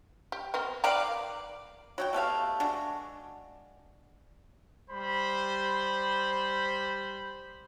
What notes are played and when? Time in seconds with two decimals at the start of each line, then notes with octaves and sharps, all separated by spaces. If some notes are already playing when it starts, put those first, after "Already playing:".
0.32 G4
0.54 B3 C4 A#4
0.84 D#3 B4 D5 F5 G5 A#5
1.98 F#3 F#4 G5
2.13 B2 A3 G4 F5
2.60 G#3 D4 F#4
4.90 G3 C5 B5